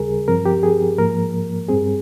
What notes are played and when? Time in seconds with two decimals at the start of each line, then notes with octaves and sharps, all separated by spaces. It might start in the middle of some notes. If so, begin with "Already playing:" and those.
Already playing: D#2 C#3 G3 G#4 A#4
0.28 G2 F3 C4 A#4
0.45 G4
0.63 G#4
0.98 G#2 F3 A#3 A#4
1.69 G2 G3 C4 G#4